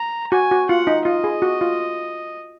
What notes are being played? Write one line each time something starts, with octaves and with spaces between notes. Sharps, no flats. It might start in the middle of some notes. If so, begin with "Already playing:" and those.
Already playing: A#5
F#4 G#5
F#4
F4 F#5
D#4
F4 D#5
G#4
F#4
F4